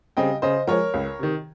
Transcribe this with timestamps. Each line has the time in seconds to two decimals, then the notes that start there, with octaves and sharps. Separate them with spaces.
0.17 C#3 G3 C4 D#5 G5
0.42 C#3 C5 D#5
0.67 F3 G#3 A#4 C#5
0.94 C#2
1.19 C3 D#3